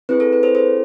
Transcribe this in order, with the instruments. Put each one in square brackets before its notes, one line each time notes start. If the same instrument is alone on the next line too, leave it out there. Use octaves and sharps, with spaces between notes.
[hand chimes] C4 E4 G#4 B4
A4
B4
A4 C5
A4 C5